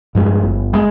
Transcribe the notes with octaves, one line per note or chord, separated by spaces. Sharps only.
G2 F3 G#3
G1
F3 G#3